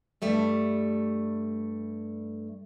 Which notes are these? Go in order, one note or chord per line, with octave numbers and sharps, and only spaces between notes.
G2 G3 A3